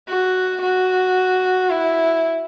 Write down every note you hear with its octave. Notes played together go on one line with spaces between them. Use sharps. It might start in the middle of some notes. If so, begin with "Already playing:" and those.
F#4
F#4
E4